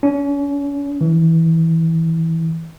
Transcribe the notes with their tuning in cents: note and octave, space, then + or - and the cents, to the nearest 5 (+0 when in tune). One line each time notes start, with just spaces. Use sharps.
C#4 +35
E3 -15